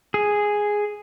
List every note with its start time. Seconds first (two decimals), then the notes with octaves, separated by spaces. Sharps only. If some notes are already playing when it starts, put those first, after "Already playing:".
0.14 G#4